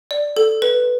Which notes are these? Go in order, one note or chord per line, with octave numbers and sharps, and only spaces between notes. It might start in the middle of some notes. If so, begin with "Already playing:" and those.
D5
A4
B4